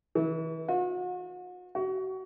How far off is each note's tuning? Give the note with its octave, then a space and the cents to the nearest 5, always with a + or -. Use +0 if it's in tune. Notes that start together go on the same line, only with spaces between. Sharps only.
E3 -35
F#4 -40
F#4 +30